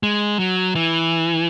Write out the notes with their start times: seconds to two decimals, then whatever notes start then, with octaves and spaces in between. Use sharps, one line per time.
0.03 G#3
0.39 F#3
0.75 E3